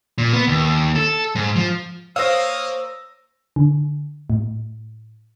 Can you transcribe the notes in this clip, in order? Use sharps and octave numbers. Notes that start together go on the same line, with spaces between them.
A#2
B3
D#2
A4
G#2
F3
A#3 C5 C#5 F5 D#6 E6 A#6
D3
A2